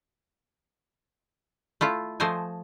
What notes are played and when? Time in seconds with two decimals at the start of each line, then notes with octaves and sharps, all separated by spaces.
1.81 A3 E4 F4
2.20 F3 A3 C5 D#5 G#5